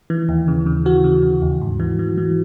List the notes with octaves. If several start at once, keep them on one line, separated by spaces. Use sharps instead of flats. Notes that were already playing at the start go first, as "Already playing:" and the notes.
E3
D#2
C#3
C#3
E3 F#4
C#3
C#3
D#2
G#2
E3
E3
E3